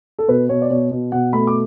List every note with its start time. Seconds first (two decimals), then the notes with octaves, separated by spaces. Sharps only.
0.19 A4
0.28 B2 B4
0.49 B2 C#5
0.62 D5
0.70 B2 C#5
0.91 B2
1.12 B2 F#5
1.33 A3 B5
1.47 D6